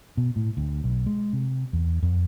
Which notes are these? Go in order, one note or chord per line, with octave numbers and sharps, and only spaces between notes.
B2
A2
D2
B1
G#3
C3
E2
F2